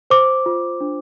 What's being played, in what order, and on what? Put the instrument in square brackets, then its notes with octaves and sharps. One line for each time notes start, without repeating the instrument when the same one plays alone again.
[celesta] C5 D6
F4
D4